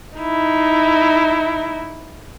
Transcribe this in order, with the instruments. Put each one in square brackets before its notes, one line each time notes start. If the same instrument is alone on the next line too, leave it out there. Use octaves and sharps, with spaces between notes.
[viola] D#4 E4